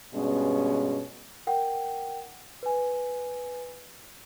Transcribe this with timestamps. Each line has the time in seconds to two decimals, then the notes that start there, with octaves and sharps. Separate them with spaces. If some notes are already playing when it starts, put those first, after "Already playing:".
0.14 G2 B2 G#3 B3 C#4
1.47 A#4 F#5 G5
2.63 B4 G#5